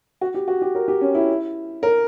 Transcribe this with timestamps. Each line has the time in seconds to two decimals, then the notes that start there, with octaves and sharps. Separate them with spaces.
0.21 F#4
0.34 G4
0.48 F#4
0.62 G4
0.75 A#4
0.88 G4
1.01 C#4
1.15 E4
1.83 A#4